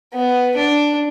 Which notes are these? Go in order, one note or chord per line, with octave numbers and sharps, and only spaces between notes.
B3
D4